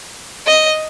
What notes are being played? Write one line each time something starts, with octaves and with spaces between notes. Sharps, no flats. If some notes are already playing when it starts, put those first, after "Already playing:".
D#5